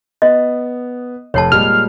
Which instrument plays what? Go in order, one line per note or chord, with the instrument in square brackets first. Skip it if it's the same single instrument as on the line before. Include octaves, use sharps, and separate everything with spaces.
[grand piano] B3 [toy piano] D#5
[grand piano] F1 A4 C7 [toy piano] C#5 A5
[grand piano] A#2 G3 G#3 [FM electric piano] F6